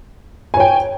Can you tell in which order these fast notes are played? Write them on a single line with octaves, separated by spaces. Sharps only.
G#5 C#5 G5